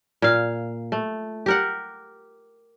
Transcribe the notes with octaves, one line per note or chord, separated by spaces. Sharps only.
A#2 F5
A3
G4 A#4 F#5